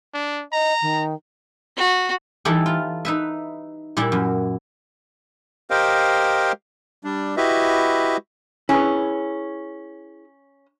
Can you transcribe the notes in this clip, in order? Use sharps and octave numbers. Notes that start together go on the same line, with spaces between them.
D4
D#5 A#5
D#3
F#4
E3 G3 D#4 E4 G4 A4
F4
D#4 B4 E5
A#2 G3 E4 G4
F#2
G4 A#4 C5 D#5 F5 G5
G3 D4
E4 F#4 G4 B4 D#5 E5
C#4 E4 G#4 B4